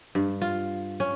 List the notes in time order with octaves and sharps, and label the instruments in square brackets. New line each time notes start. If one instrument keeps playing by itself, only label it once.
[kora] G2
F4
C#4